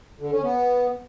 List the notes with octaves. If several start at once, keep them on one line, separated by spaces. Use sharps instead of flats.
D3
C#4
B3